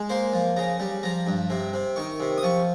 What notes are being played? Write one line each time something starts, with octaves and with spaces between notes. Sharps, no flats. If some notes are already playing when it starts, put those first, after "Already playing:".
Already playing: G#3
A#3 C5
F3
C#3 A#5
G3
F3 A#5
G2
C3
C3
D#3 C#6
C3
D#6
F3 C#6